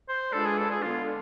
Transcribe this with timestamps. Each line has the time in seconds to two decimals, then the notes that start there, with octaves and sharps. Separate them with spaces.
0.09 C5
0.32 G#3 D4 F4 A4 B4 D5
0.46 G#4
0.58 A4
0.71 G#4
0.82 D3 G#3 B3 D4 F4